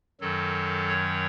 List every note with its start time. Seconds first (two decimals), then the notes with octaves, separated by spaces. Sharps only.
0.21 F#2 D#3 F#3 A4
0.88 C#5